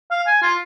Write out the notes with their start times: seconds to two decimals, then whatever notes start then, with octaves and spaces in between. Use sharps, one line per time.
0.11 F5
0.27 G#5
0.42 F4